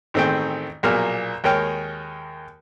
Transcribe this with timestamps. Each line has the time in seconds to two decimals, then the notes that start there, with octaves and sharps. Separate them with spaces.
0.14 A1 D#3 A3 C4 G#4 G5
0.83 B1 A#2 F3 G#4 A#4 F6
1.44 D#2 G#3 A#4 C#5 G5 F6